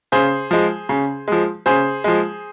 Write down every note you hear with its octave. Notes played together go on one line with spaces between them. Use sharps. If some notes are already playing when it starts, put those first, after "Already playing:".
C#3 G#4 C5
F3 G#3
C#3
F3 G#3
C#3 G#4 C5
F3 G#3